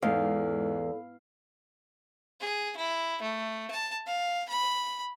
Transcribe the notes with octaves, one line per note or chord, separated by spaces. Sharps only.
E2 G#2 D#4 A4 F5
G#4
E4
A3
A5
F5
B5